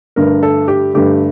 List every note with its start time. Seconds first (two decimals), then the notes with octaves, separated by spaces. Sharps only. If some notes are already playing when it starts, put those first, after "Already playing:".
0.16 G2 D3 A3 A#4
0.43 A4
0.68 G4
0.94 G2 D3 A3 G4